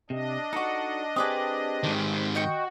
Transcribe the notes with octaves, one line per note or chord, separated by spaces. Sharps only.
C3 D4 D#5
D#4 F#4 A4 D5
C4 G4 G#4 B4 D5 D#6
G#2 D#3
F#4 D#5 G5 C#6